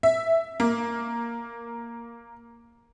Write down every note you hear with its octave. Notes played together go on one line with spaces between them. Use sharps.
E5
A#3